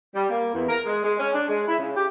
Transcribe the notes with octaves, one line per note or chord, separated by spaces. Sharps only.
G3
A#3
E2
A#4
G#3
G#3
C#4
D4
G#3
E4
C#3
G4